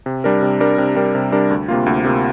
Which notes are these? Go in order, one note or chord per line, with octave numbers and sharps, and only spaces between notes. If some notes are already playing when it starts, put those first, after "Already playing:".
C3
G3 D4 A#4
C3
G3 D4 A#4
C3
G3 D4 A#4
C3
G3 D4 A#4
D2
C3 A#3 F4
D2
C3 A#3 F4